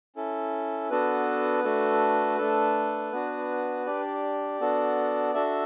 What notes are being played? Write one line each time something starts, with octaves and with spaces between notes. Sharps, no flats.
C#4 E4 A4
B3 D4 F#4 A4 B4
A3 D4 F#4 A4
A3 D4 A4
B3 D4 F#4
D4 G4 D5
B3 D4 F#4 A4
D4 F#4 A4 E5